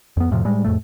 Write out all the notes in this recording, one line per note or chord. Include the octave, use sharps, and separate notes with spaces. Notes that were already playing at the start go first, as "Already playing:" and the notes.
F2 B3
F2 A2 C3 F3
A2 G3 G#3
F2 A2 A3